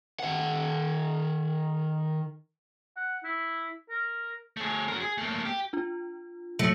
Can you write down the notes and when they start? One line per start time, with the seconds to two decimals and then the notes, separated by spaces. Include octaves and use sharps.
0.20 D#3 F#5
2.97 F#5
3.24 E4
3.90 A#4
4.57 A3 G#4
4.88 F#4 A#4
5.00 G#4
5.18 A3 A#3
5.45 G4
5.73 D4 F4
6.59 B2 F#3 A3